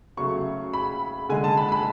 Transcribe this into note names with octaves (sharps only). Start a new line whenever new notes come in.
C#3 F#3 A3 C#6
B5
D3 G#3 G#5
A5
B5
B5